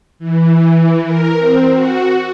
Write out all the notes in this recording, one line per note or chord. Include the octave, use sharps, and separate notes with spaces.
E3
A#4
C4
F#4